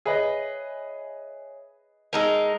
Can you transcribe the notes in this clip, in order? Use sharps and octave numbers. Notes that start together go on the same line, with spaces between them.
G#4 B4 C#5 D#5 E5 G#5
G#3 D#4 A#4 A5 E6